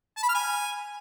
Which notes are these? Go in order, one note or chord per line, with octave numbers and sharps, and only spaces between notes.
A5
B5
F6
G#5